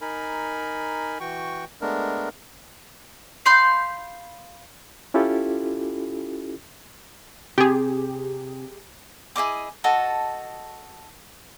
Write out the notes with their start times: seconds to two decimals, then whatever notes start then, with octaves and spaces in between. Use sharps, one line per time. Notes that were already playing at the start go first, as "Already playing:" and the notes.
0.01 D#4 A#4 G#5 B5
1.20 E3 F#4 G5 C#6
1.81 G#3 A3 B3 D4 A#4
3.46 F5 B5 C6 G6
5.14 C#4 E4 F4 G4 A4
7.58 C3 G4 G#4
9.36 E4 G#4 D#5 D6
9.84 F#4 A4 D#5 A5